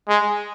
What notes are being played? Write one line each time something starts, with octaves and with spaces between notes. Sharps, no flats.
G#3